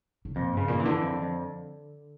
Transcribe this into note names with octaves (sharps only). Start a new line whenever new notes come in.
C#3
F2 A#2
G2 C#3
A#2
E3
D3
F2
F2